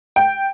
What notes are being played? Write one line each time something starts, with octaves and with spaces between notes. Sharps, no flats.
G5